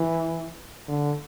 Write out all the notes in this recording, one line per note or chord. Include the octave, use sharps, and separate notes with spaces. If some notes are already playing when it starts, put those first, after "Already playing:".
Already playing: E3
D3